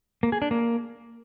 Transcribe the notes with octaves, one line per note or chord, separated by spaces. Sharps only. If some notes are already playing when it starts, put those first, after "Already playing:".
A#3
G#4
D4
A#3